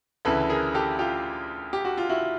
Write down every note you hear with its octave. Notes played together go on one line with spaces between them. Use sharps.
D2 C#3 E3 A4 B4
G#4 A#4
G4 A4
F4 G4
G4
F#4
F4
E4 F#4